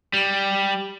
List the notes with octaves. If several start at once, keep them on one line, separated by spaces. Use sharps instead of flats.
G3